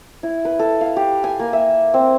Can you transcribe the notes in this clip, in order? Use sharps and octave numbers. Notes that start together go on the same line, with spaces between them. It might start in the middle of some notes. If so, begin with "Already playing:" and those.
E4
B4
A4
F5
G4
G#5
A#3
E5
C4